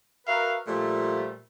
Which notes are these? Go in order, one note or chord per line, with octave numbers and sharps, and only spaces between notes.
F#4 A#4 B4 E5 F5
A#2 F3 G3 A3